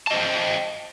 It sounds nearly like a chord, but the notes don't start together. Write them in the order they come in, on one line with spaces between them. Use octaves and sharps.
A5 D#5 C5 G5